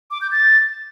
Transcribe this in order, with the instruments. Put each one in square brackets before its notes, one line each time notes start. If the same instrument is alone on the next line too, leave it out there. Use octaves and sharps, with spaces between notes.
[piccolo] D6
G6
A6